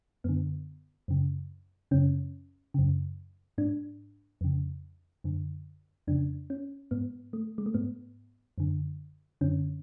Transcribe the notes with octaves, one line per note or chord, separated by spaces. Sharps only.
F#2 D3 B3
F#2 C#3
F#2 C#3 C#4
F#2 C#3
G#2 D4
F2 C#3
F#2 D3
F2 C#3 D4
C#4
G#2 B3
A3
G#3
A3
G#2 B3
F#2 D3
F#2 D3 C#4